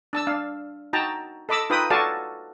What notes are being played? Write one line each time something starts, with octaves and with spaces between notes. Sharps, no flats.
D4 A5 E6
D4 F5
D#4 F#4 G5 A5 A#5
A4 D#5 B5 D6 E6
D#4 F4 B4 G5 B5 D#6
F#4 A4 D5 F5 G#5 A5